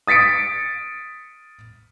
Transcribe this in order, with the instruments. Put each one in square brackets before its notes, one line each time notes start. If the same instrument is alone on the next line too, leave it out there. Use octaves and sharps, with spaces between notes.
[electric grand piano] D#6 A6 B6 C#7 D7